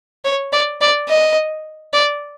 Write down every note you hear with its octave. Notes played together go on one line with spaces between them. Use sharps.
C#5
D5
D5
D#5
D5